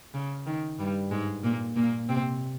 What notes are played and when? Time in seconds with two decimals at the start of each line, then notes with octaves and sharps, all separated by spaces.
0.14 C#3
0.46 D#3
0.79 G2 G3
1.11 G#2 G#3
1.44 A#2 A#3
1.76 A#2 A#3
2.09 C3 C4